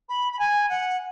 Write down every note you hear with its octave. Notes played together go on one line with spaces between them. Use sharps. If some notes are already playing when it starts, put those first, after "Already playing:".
B5
B5
G#5
F#5